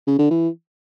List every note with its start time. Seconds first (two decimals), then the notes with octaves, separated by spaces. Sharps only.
0.07 C#3
0.19 D3
0.31 E3